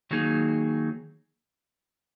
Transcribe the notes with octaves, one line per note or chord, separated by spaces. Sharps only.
D#3 F#3 A#3 D#4 G#4